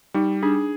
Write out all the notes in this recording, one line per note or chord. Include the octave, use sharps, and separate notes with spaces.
G3 D#4
D4 G#4